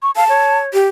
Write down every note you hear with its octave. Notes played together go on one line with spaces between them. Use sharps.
C#6
F5 A5
C#5
G4